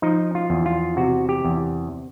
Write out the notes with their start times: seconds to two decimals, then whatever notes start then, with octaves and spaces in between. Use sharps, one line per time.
0.02 F3 D#4
0.35 F4
0.50 E2
0.66 F4
0.97 C3 F#4
1.29 G4
1.45 E2